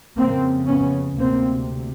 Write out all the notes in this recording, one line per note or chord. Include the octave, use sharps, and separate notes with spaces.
F2 C#3 A#3 C4
B3 C#4
D2 C3 A#3 C4